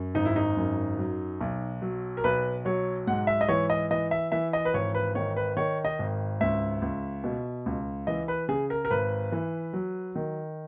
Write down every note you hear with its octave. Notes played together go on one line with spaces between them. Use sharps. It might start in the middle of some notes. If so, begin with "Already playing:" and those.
Already playing: F#2
G#1 D#4
E4
D#4
F#2
F#3
B1
F#3
A#4
B1 B4
F#3 C#5
G#2 F#5
E5
D#5
E3 C#5
D#5
E3 D#5
E5
E3 E5
D#5
B4
G#1 C#5
B4
D#3 C#5
B4
D#3 C#5
D#5
G#1
C#2 E5
C#2
B2
C#2
E3 D#5
B4
C#3 G#4
A#4
A#4
G#1 B4
E3
F#3
D#3